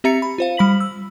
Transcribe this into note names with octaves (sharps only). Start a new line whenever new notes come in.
C4 G4 E5 A#5 A6 C#7
B5
F4 C5 F5
G3 B5 B6 F#7
E6